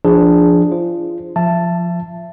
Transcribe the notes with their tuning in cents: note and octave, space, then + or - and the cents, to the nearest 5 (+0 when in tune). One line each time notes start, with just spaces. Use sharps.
F3 -15 D4 +0 G#4 +0
F4 -25 C5 +0
F3 +0 E5 +30 A5 +0